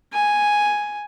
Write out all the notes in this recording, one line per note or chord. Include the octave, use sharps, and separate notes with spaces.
G#5